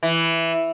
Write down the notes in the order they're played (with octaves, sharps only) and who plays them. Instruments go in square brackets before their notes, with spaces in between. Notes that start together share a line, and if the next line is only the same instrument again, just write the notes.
[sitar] E3